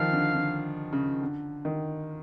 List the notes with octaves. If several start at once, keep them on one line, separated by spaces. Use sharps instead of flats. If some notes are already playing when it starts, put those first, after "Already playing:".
Already playing: D#3 F3 F5
D3
D3
C#3
D3
D#3